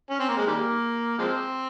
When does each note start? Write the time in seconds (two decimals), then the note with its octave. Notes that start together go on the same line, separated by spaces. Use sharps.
0.10 C#4
0.19 C4
0.28 A#3
0.37 G#3
0.46 D#3 G3 A#3
1.18 F3 G#3 C4